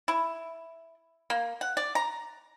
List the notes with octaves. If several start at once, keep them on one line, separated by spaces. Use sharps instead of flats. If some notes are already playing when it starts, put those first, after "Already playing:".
E4
A#3
F#5
D5
A#5